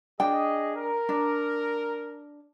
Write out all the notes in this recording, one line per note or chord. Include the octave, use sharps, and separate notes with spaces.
D4 G#4 D#5 G5
A#4
D4